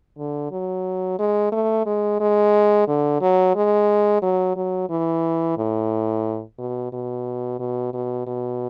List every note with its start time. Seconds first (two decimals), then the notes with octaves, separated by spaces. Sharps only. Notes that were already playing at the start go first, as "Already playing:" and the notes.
0.18 D3
0.51 F#3
1.19 G#3
1.52 A3
1.86 G#3
2.20 G#3
2.87 D3
3.21 F#3
3.56 G#3
4.22 F#3
4.56 F#3
4.90 E3
5.58 A2
6.59 B2
6.92 B2
7.59 B2
7.93 B2
8.27 B2